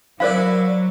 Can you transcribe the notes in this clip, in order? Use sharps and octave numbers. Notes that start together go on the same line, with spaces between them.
F#3 E4 A#4 C5 D5 F5